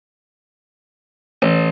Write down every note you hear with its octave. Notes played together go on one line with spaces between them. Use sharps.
A1